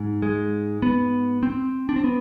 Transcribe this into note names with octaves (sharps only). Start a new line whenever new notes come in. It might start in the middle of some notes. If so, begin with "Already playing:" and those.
Already playing: G#2
G#3
B3
C4
D4
C4
B3